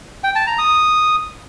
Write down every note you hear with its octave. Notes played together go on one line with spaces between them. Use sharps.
G5
A5
A#5
D#6